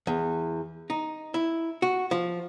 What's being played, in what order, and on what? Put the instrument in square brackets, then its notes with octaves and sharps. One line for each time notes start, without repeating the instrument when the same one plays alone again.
[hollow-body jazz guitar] E2
D#4
E4
F#4
F3